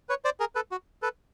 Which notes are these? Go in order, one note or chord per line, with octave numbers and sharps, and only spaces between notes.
B4 C#5
C5 D5
G#4 A#4
A4 B4
F#4
A4 B4